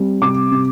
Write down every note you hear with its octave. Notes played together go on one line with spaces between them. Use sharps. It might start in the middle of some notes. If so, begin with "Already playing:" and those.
Already playing: G3 C4
C3 D6
C3